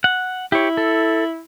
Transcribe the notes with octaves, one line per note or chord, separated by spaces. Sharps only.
F#5
E4 G4 C#5
A4